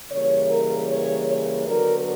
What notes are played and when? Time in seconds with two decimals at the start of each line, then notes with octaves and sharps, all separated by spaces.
0.11 C#3 E3 G3 A#3 C#5
0.50 A#4
0.89 C#5
1.28 C#5
1.67 D3 F#3 B3 A#4